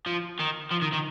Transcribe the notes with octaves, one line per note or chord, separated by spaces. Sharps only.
F3
D#3
F3
D#3
D#3